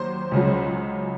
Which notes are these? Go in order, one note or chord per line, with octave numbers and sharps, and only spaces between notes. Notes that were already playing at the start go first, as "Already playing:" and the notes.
Already playing: D#2 F#3 C5 C6
C#2 C#3 F#3